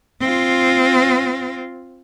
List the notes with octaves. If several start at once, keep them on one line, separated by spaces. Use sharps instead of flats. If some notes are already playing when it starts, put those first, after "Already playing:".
C4 F4